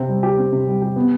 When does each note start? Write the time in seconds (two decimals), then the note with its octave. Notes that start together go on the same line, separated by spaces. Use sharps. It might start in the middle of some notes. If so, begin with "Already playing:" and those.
Already playing: C3 C4
0.08 G3
0.23 G4
0.38 C4
0.52 C3
0.67 G3
0.82 G4
0.96 B3